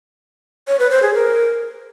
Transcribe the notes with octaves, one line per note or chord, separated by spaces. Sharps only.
C#5
B4
C5
G#4
A#4